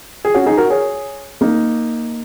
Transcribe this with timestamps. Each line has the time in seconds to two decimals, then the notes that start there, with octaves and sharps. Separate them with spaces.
0.25 G#4
0.34 C#4 F#4
0.46 D#4 G#4
0.58 F#4 A#4
0.70 G#4 C#5
1.41 A#3 D#4